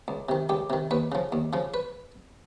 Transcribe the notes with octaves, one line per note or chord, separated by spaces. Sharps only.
C#2
C3 D#3
C#2 G4
C3 D#3
D#2 B4
C#3 F3
D#2
C#3 F3
B4